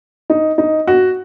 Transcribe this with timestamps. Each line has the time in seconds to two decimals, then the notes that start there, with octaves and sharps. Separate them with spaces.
0.30 D#4
0.58 D#4
0.87 F#4